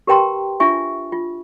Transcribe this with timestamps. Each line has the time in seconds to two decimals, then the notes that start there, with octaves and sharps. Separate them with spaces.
0.07 G4 A#4 B4 G5 A#5 C6
0.60 D4 F4 E5 G#5 C#6
1.12 F4